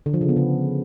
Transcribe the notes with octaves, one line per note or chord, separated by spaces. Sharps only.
D3
F3
C#3
B3
C#3